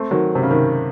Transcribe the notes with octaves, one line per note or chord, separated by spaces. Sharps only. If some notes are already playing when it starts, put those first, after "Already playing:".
Already playing: A3 C4
D#3 F#3
C3
C#3
C3 D#3